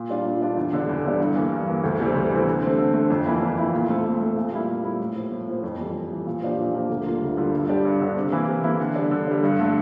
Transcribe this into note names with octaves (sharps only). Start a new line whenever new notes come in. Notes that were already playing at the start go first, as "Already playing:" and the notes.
Already playing: A#2
G3 D4 F4
A#2
G3 D4 F4
E2
D3 G3 D4
E2
D3 G3 D4
G2
E3 A#3
G2
E3 A#3
D2
C3 E3 G3 C4
D2
C3 E3 G3 C4
D3
A3 C4
D3
A3 C4
F2
E3 A#3 E4
F2
E3 A#3 E4
A#2
A3 C4
A#2
A3 C4
A#2
G3 A#3 E4
A#2
G3 A#3 E4
A2
F3 A#3
A2
F3 A#3
F2
E3 G3
F2
E3 G3
A#2
F3 A#3 D4 G4
A#2
F3 A#3 D4 G4
D2
D3 G3 A#3 F4
D2
D3 G3 A#3 F4
G2
D3 G3 D4 G4
G2
D3 G3 D4 G4
C3
E3 A#3 E4
C3
E3 A#3 E4
D3
G3 D4
D3
G3 D4
G2
D3 A3